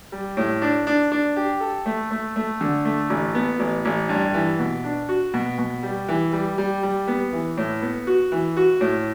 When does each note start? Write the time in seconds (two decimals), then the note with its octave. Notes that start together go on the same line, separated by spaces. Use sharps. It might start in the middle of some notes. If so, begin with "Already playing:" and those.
0.12 G3
0.37 A2
0.62 D4
0.87 D4
1.12 D4
1.36 G4
1.60 A4
1.86 A3
2.11 A3
2.36 A3
2.61 D3
2.85 A3
3.10 A1
3.35 B3
3.59 A1
3.85 A1
4.09 G2
4.34 E3
4.59 B2
4.84 D4
5.09 F#4
5.34 B2
5.58 B2
5.83 G3
6.08 E3
6.33 G3
6.58 G3
6.83 G3
7.08 B3
7.33 E3
7.57 A2
7.82 B3
8.07 F#4
8.32 E3
8.57 F#4
8.81 A2